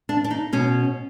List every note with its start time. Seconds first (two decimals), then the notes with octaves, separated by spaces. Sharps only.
0.09 D4
0.24 D4
0.31 D#4
0.53 B2 C#4